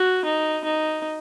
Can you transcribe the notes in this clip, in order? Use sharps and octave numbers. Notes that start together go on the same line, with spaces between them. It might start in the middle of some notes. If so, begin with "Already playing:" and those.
Already playing: F#4
D#4
D#4